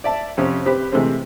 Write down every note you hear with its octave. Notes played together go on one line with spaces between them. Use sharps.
D5 E5 A5
F2 C3 C#4
C4 G4 B4
C3 E3 G#3 A3 C4